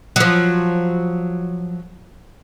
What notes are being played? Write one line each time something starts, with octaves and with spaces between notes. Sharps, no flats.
F3 F#3